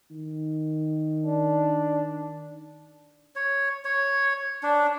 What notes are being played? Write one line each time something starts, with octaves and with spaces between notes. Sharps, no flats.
D#3
D4
C#5
C#5
D4